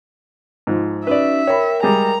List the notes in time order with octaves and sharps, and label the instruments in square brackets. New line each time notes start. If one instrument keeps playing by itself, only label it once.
[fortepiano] G#2 F3
[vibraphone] C#4 D#4 F#4 [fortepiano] B4 D5 [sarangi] E5
[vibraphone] A#4 G5 [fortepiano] C#5 B5
[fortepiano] G3 G#3 G#4 [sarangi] A#5